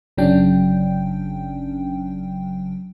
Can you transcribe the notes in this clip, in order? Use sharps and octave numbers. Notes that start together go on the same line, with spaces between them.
G1 C#3 F#3 C#4 D4 G5